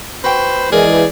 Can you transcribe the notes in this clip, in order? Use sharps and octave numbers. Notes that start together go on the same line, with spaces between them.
F#4 B4 C5 G5
E3 G#3 G#4 A#4 D5